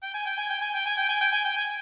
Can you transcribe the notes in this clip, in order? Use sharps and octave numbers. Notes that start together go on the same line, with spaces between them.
G5
G#5
G5
G#5
G5
G#5
G5
G#5
G5
G#5
G5
G#5
G5
G#5